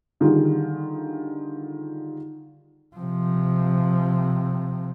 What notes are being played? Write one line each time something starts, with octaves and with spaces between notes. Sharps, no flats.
D3 D#3 G3 F4 G#4
C3 F3